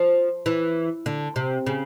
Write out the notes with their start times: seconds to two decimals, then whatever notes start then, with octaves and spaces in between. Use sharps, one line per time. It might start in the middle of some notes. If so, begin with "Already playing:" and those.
Already playing: F3
0.46 E3
1.06 D3
1.36 C3
1.66 C#3